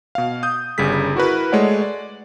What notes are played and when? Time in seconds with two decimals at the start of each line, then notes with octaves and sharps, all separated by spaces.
0.15 B2 F5
0.43 D#6 G6
0.78 G1 C#3 G3 G#4 B6
1.15 E4 F#4 A#4 B4
1.52 G#3 A3 C#5 D5 F#5
1.82 D5